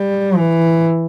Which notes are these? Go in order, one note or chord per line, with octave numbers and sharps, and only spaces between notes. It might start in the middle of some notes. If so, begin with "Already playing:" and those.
Already playing: G3
E3